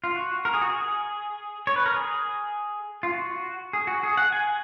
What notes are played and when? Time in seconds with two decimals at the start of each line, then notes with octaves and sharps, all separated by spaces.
0.04 F4
0.15 F#4
0.45 A#4
0.54 G#4
0.62 F#4
0.70 G#4
1.67 C#5
1.76 B4
1.86 A#4
1.95 G#4
3.03 F4
3.13 F#4
3.73 G#4
3.87 F#4
4.03 G#4
4.17 F#5
4.32 G#5